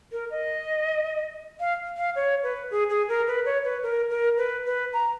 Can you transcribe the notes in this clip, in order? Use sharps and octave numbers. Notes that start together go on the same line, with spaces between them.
A#4
D#5
F5
F5
C#5
B4
G#4
G#4
A#4
B4
C#5
B4
A#4
A#4
B4
B4
A#5